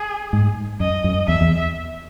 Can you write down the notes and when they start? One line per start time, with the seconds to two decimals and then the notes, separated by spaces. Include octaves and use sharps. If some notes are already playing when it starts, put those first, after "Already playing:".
Already playing: G#4
0.33 G#2
0.80 F#2 D#5
1.04 F#2
1.27 E2 E5
1.41 E2